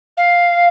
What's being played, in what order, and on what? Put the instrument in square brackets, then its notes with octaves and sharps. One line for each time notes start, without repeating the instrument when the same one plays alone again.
[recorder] F5